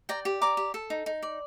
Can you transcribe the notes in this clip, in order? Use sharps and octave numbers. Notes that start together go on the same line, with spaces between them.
D5 G5 A#5
G4
D5 A#5 D6
G4
A4
D#4
D#4
D5